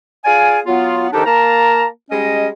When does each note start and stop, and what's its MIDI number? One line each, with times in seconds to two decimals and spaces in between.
0.24 0.60 65
0.24 0.60 68
0.24 0.60 74
0.24 0.60 77
0.24 0.60 80
0.66 1.07 54
0.66 1.07 59
0.66 1.07 65
1.13 1.24 48
1.13 1.24 51
1.13 1.24 62
1.13 1.24 63
1.13 1.24 67
1.13 1.24 69
1.26 1.86 58
1.26 1.86 81
1.26 1.86 82
2.11 2.48 55
2.11 2.48 56
2.11 2.48 61
2.11 2.48 75